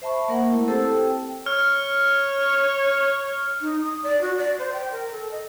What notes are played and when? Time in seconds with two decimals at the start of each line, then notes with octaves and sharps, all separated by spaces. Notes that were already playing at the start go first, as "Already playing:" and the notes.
0.02 C5 E5 A5 B5 C#6
0.28 A#3 A#4 F#5
0.52 A3 E4
0.68 C4 G4 A4 C5 A5 E6
0.92 G5
1.46 C#5 F6
3.61 D#4
3.82 D#6
4.03 D5
4.21 F#4
4.38 D5
4.59 C5
4.73 G5
4.91 A#4
5.11 A4
5.31 D#5